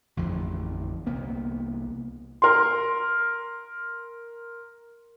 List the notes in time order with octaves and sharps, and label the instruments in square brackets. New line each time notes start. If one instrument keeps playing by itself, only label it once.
[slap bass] A1 F2 D3 F3
C2 A#3 B3
[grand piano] A#4 C6